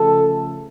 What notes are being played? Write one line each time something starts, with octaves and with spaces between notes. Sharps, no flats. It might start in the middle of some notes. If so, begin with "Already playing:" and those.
Already playing: C#3 F3 A3 A4